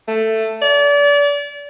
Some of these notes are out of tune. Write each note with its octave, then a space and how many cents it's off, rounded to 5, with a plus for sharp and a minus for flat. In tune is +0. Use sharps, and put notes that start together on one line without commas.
A3 +10
D5 -35